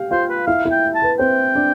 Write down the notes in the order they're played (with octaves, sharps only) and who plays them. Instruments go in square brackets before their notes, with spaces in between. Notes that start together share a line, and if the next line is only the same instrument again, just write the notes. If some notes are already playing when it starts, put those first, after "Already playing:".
Already playing: [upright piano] G4 F5 G5
[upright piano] F4 F5 [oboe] C5
[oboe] B4
[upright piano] E4 E5 [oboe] F5
[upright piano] E4 E5
[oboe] G5
A5
[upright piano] B4
[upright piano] C4 C5 [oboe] G5
[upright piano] D4 D5